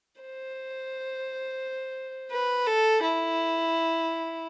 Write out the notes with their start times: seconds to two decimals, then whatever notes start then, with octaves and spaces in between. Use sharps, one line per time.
0.21 C5
2.31 B4
2.66 A4
3.02 E4